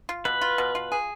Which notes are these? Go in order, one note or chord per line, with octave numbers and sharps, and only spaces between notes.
F4
B2 B4
F4
B2
F4
G#4